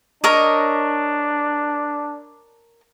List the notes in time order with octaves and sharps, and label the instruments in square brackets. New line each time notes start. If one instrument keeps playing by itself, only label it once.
[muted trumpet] D4 [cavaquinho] A#4 C#5 D#5